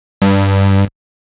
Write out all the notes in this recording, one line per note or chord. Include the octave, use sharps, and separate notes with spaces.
G2